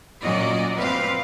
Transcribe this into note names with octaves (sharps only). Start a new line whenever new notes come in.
A#2 F#3 C#4 F#4 D5 D#5
F3 C4 B4 F5